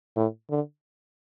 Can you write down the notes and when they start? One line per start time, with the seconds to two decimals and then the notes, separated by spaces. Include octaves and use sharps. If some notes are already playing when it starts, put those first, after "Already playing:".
0.16 A2
0.50 D3